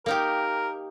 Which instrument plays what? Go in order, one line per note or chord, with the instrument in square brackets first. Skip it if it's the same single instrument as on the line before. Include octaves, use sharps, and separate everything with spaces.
[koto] A#3 D#4 G4 [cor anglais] A#4